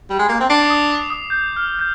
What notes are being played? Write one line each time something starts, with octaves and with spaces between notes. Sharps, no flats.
G3
G#3
A#3
C4
D4 C7
D6
D#6
D6
D#6
G6
F6
G6